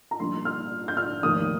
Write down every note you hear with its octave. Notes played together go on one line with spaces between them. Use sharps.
A#5
A#1 A#2 G3 A#3 D#4 C6
F6
G6
F6
F1 D#2 D#3 D#6